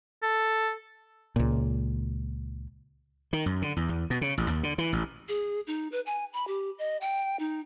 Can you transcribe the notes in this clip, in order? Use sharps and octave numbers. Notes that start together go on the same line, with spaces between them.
A4
C#2 A#2
D#3
F#2
D3
E2
E2
B2
C#3
A1
D#2
D3
E3
A1
G#4
D#4
B4
G#5
B5
G4
D#5
G5
D#4